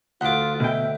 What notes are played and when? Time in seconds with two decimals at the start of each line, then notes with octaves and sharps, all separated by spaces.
0.21 D2 F4 F#5 D6
0.60 B2 E5 G5